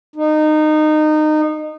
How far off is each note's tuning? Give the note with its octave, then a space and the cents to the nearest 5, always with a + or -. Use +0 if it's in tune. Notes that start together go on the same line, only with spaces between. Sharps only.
D#4 -20